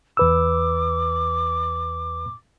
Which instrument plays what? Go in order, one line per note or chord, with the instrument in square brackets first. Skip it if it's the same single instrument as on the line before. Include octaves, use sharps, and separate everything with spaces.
[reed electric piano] E2 B4 E6 [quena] D6